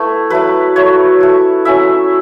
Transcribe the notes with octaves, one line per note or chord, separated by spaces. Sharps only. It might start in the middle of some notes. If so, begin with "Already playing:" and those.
Already playing: A3 B3 E4
F#3 A3 E4 B4
F#3 A3 E4 C#5
A3 E4
F#3 C#4 E4 E5